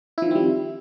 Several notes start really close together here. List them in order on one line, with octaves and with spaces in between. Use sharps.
E4 F3 D#3 C4 G3